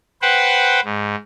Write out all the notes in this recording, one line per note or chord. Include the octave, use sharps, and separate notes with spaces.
B4 C5 F#5 G5
G#2